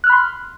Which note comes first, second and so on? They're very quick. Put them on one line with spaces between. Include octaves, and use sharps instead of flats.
F#6 F6 B5 C6